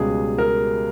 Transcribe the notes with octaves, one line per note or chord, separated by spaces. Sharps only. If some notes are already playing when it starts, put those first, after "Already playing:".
Already playing: C#2 B2 G3 C#4 G#4
A#4